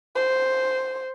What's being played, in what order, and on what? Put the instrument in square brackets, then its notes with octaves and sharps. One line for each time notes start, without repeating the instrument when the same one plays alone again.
[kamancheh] C5